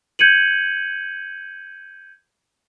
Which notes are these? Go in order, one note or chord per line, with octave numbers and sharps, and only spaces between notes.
G6 G#6 C#7 D#7 F#7